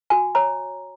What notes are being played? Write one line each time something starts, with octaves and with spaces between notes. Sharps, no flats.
F#4 G#5
C#5 A#5